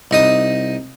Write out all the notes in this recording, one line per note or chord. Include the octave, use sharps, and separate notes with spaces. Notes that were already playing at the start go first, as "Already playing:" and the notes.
C2 D#4 D#6